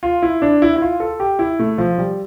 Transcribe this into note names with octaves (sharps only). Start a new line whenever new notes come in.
F4
E4
D4
E4
E4
F4
A4
G4
E4
A3
F3
G3